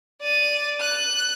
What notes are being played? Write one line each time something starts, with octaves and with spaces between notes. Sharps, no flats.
D5 D#7
F#6